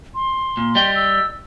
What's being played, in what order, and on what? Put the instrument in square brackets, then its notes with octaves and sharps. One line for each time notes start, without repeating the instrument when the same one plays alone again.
[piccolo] C6
[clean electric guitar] A#2
G3 D#5 G5
[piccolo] E6